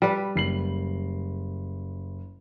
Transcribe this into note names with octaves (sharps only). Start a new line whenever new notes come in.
G3 B4
F#1 C7 F#7